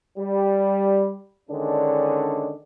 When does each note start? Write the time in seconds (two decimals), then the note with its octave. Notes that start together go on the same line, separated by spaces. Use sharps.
0.18 G3
1.50 D3 D#3 G#3 C#4 D4